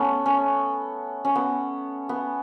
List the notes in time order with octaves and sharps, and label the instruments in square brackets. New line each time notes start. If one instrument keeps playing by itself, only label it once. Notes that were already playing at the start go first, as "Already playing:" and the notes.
Already playing: [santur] A3 B3 C#4
C#4
C#4
B3
B3